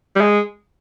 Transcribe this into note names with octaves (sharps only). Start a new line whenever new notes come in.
G3
G#3